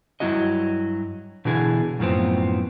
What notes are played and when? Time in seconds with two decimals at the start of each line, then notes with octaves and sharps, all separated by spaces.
0.20 G2 F#3 A3 E4 F#4 D#5
1.45 B2 D3 E3 G#4
1.99 F#2 A2 F3 B3 C4